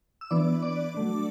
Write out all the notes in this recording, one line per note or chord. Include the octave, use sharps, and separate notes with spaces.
E6
E3 B3 D4 D5 D6
D5 D6
F#3 A3 D4